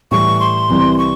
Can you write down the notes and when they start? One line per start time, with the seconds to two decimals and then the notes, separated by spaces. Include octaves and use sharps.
0.11 A2 E3 G3 C#6
0.40 C6
0.69 C2 C3 E3 G3
0.98 C#6